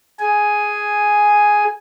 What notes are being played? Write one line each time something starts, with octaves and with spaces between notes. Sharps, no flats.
G#4 G#5